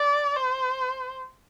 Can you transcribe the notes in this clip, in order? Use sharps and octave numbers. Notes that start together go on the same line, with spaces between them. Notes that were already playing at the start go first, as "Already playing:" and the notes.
Already playing: D5
C5